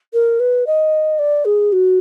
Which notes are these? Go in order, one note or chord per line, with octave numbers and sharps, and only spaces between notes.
A#4
B4
D#5
D5
G#4
F#4